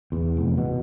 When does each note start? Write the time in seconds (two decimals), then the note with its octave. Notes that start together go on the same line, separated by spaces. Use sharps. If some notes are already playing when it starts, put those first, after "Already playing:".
0.12 E2
0.37 F1
0.57 B2